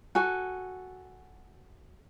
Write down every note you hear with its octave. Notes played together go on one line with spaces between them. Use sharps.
F#4 A4 G#5